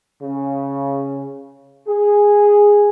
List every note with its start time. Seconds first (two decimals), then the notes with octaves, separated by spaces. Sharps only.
0.23 C#3
1.88 G#4